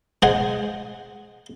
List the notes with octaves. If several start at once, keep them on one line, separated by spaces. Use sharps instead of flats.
G#3 G#4 C5 F#5 G#5